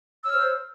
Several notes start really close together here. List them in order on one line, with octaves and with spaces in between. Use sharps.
E6 C#5 F6 C5